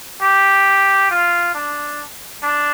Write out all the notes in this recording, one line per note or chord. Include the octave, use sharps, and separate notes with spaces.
G4
F4
D4
D4